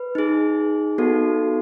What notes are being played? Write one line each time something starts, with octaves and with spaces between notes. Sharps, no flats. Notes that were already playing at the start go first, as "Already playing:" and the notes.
Already playing: B4
D#4 G#4
B3 D#4 F#4 A4